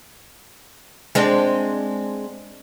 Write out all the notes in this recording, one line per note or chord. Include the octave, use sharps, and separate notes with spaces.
G#3 C4 D4